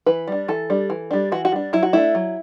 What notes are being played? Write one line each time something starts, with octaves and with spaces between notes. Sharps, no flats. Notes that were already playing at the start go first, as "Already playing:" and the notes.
E3 B4
G3 D4
E3 A4
G3 D4
E3
G3 D4
E3 F#4
F#4
G3 D4
F#3 E4
F#4
A3 D4 E4
F#3